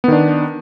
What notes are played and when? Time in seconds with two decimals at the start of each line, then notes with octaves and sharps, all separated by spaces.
0.04 B3
0.08 D#3
0.12 D4